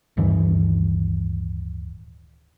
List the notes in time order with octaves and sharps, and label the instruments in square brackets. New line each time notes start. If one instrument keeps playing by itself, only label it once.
[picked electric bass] D1 G2 D#3 E3